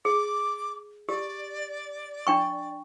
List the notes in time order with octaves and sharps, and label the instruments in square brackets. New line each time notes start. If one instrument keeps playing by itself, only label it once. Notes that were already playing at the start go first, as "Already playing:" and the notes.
[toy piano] G#4 [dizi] D6
[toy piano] G4 [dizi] D5
[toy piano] D4 G5 C#6